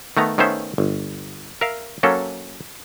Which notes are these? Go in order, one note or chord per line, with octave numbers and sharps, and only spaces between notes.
D#3 A3 B3 A#5
D#3 A3 B3 C#4 C5 E5
G1
A#4 E5 F5
F#3 A#3 C#4 A4